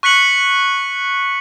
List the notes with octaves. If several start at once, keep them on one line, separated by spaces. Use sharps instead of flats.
C#6 F#6 B6 C#7 F#7